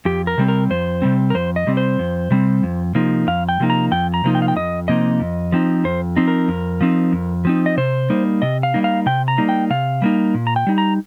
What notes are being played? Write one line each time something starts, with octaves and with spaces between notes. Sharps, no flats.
F2 G4
A#4
C3 G3 C4
A#4
F2 C5
C3 G3 C4
A#4
F2 C5
D#5
C3 G3 C4
C5
F2
C3 G3 C4
F2
C3 F3 A#3 D#4
F2 F5
G5
C3 F3 A#3 D#4
A#5
F2 G5
A#5
C3 F3 A#3 D#4
G5
F5
G5
F2 D#5
C3 F3 A#3 D#4 D#5
F2
F3 C4 D#4
F2 C5
F3 C4 D#4
A#4
F2
F3 C4 D#4
F2
F3 C4 D#4
D#5
C3 C5
G3 A#3 D#4
C3 D#5
F5
G3 A#3 D#4
F5
C3 G5
A#5
G3 A#3 D#4
G5
C3 F5
G3 A#3 D#4
A#2
A#5
G5
G3 D#4
A#5